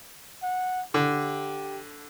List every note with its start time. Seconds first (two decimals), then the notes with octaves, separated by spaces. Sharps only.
0.43 F#5
0.94 D3 G4